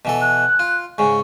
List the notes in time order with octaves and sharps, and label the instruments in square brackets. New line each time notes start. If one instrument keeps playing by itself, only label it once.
[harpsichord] B2 E3 A4
[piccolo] F#6
[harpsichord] F4
[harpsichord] G#2 C#3 [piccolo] C#6